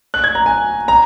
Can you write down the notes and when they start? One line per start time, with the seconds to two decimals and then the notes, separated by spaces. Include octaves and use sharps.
0.14 F#6
0.24 G#6
0.35 A#5
0.46 G#5
0.88 A#5